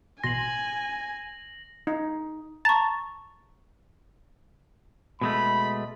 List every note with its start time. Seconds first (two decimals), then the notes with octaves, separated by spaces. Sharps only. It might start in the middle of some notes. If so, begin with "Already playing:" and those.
0.24 A1 B2 G#5 C6 A#6 F#7
1.87 D#4
2.65 A5 A#5 C#6
5.21 B2 G#3 A3 B5